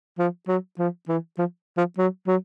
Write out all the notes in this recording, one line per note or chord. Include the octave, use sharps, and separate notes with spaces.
F3
F#3
F3
E3
F3
F3
F#3
F#3